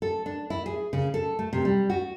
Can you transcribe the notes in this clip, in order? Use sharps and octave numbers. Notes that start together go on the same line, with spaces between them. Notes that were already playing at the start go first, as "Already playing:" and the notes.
A4
D4
E4
G#4
C#3
A4
A3
C3
G3
F#4